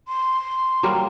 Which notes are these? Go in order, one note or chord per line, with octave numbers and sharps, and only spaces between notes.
C6
F#3 G3 A#3